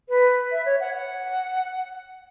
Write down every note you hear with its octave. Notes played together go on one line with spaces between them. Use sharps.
B4
E5
C#5
F#5
F#5